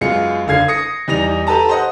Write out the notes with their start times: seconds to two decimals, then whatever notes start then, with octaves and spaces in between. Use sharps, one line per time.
0.01 F#2 G#3 B3 F4 C#7
0.47 F#1 D3 F5 G#6 C7
0.68 D#6 A#6 C#7
1.08 E2 G3 D#4 A#6 F7
1.47 G4 A4 B4 A5 A#5
1.69 C5 D#5 F#5